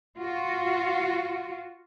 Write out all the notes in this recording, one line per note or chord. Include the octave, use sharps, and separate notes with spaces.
F4 F#4